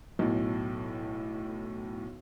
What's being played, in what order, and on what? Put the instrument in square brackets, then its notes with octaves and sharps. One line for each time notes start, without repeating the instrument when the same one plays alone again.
[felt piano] B1 A2